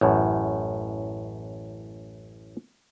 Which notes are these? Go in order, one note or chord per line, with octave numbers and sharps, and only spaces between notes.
A1 F#2 A2